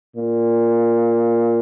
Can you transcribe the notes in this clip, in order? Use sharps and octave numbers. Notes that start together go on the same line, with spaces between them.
A#2